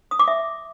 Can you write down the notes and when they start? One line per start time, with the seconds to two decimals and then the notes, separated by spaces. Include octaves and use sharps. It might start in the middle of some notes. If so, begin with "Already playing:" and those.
0.11 D#6
0.19 D6
0.28 E5